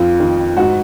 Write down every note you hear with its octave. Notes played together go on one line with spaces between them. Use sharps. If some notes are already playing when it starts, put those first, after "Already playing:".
Already playing: F2 F4
D#3
G#2 F#4